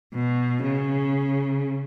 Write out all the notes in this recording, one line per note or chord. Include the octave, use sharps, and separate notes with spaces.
B2
C#3